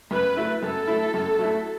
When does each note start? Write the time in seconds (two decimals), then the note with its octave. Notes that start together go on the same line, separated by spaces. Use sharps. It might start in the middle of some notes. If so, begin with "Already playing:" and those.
0.11 F#2 B4
0.37 F#3 A3 E4
0.62 F#2 A4
0.87 F#3 A3 E4
1.14 F#2
1.39 F#3 A3 E4